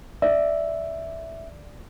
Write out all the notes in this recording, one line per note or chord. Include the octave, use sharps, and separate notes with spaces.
D5 E5